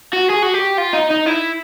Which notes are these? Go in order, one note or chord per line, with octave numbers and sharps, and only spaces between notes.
F#4
G#4
F#4
G4
F4
D#4
D#4
E4